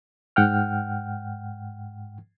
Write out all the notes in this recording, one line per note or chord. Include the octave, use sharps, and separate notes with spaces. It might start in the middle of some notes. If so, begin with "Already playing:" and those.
G#2 F#5 G5 F6